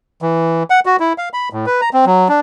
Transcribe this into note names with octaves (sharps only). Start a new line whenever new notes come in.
E3
F#5
F#4
E4
F5
B5
A2
B4
A#5
C4
F#3
D4